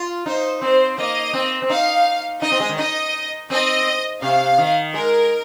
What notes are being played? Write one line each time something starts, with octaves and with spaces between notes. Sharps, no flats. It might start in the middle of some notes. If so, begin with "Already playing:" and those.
Already playing: F4
D#4 C5
C4 C5
A#3 D#5
C4
C4
D#4 F5
D#4 D#5
C4
G#3
D#3
D#4 D#5
C4 D#5
C3 F5
D#3
G#3 A#4